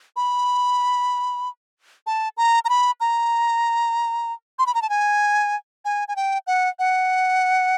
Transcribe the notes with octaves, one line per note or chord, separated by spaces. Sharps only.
B5
A5
A#5
A#5
B5
A#5
C6
B5
A#5
A5
G#5
G#5
G#5
G5
F#5
F#5